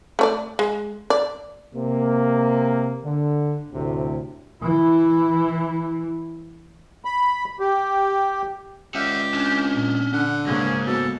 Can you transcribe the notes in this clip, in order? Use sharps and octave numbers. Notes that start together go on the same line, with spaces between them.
A3 C#5 D5
G#3
D5
C3 A#3
D3
D2 A2 C3
E3 E4
B5
G4
C#2 G4 E5 F#5
C#4 D4
A#2
D3 F#5
G#2 C#3 A#3 C#4
B2 A4